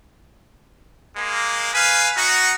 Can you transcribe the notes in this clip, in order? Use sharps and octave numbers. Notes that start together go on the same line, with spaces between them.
G#3 A#3
B4 F5 G#5
D#4 F#4